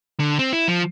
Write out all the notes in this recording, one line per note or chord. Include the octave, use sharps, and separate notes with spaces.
D3
C4
E4
F3